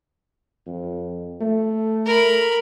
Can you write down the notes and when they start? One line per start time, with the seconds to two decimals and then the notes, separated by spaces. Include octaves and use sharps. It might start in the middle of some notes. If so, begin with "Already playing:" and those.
0.67 F2
1.41 A3
2.06 A#4 B5